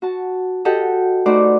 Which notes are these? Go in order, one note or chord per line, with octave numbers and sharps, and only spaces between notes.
F#4 A5
F#4 G4 A4 D#5 G5
A3 D#4 F#4 B4 C5 D5